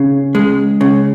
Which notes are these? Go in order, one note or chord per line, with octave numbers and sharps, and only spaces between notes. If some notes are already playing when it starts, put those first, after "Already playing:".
Already playing: C#3
G#3
C#3